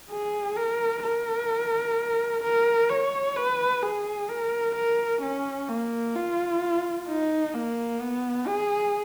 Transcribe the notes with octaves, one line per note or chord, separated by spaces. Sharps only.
G#4
A#4
A#4
A#4
C#5
B4
G#4
A#4
A#4
C#4
A#3
F4
D#4
A#3
B3
G#4